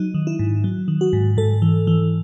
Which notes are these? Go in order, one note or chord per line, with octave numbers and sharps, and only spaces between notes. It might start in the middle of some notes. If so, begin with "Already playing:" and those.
Already playing: F#3 D#4
D#3
E4
G#2
F#3
D#3
F#4
G#2
G#2 A4
E3
E3